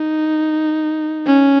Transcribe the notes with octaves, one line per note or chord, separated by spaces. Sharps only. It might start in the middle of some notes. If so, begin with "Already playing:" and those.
Already playing: D#4
C#4